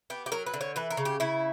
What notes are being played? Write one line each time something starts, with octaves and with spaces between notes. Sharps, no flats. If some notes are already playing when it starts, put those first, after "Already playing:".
B3 G4
G4
F#3 A#4
B4
D3
C#5
E3 B4
A#4
C#3
G4
C#3 E4